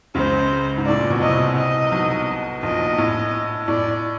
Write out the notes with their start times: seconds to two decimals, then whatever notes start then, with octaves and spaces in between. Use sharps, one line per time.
0.15 C#2 C#3 C5
0.77 G#2
0.86 A2 D5
0.99 A#2
1.10 B2
1.21 C2 C3 D#5
1.56 D#5
1.92 B1 B2
2.62 A#1 A#2 D#5
2.98 A2
3.68 A2 D5